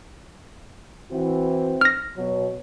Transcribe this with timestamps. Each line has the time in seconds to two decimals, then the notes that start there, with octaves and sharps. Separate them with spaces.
1.12 E3 C4 E4 F#4
1.81 F6 A#6
2.17 B2 F#3 C#5